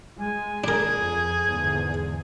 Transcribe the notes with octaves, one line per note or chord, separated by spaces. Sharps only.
G#3 G#5
D4 G#4 A#4 G#6
F2
E2 G#2 D3